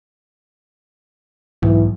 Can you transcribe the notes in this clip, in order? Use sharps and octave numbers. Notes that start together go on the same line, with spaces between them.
B1 G#2 E3